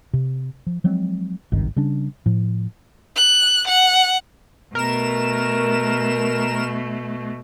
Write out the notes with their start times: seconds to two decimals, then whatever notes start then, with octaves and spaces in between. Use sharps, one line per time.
0.13 C3
0.67 F3
0.84 F3 F#3 G#3 C4
1.52 G#1 C#2 G2 D#3
1.76 C#3 G3 C#4 D4
2.26 A2 F3
3.16 F#6
3.67 F#5
4.75 B2 A3 A#4 E7